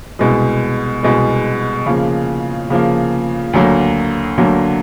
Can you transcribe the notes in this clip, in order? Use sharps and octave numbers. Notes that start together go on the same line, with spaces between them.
C2 B2 G#3
C2 B2 G#3
C#3 F3 A#3
C#3 F3 A#3
D2 D3 F#3 A#3
D2 D3 F#3 A#3